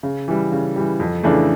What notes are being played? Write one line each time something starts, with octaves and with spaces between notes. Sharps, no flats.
C#3
E3 G3
C#3
E3 G3
F2
C#3 E3 A3 D4